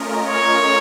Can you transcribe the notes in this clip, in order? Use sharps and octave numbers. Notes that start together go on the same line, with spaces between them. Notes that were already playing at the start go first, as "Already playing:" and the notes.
Already playing: A3 C#4 F4 A#4 D#5
C#5